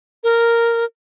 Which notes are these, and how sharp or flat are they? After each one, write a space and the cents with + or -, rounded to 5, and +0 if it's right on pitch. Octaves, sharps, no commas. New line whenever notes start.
A#4 -5